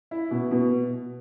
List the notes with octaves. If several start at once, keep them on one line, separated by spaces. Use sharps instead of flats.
E4
B2
B2